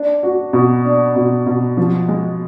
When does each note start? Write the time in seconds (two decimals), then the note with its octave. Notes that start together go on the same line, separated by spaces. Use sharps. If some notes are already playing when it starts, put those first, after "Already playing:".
Already playing: D4
0.23 F#4
0.53 B2
0.85 D4
1.16 B2
1.46 B2
1.77 F3
2.08 G#3